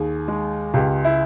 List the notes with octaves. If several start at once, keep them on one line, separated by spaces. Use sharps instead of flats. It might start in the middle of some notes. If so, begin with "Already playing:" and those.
Already playing: D#2 G#4
G#3
C#2 G4
E4